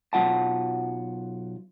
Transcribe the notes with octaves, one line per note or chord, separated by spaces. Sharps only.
B1 F#3 G#3 F4 F#5 A5